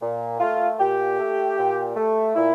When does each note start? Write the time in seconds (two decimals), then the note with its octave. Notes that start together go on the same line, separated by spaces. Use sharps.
0.02 A#2
0.40 A3 F4
0.79 A#2 G4
1.18 A3
1.58 A#2
1.96 A3
2.35 A#2 E4